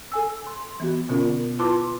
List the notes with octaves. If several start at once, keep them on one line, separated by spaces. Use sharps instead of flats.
A4 G#5 E6
C6
E3 B3 F#4
B2 D3 B3 C#4 F4 A#4
E4 F4 B4 A5 C6 D6